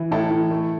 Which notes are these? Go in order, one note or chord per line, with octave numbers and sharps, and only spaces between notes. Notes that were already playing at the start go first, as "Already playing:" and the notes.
Already playing: E3
A2 E4 A4
E3
A3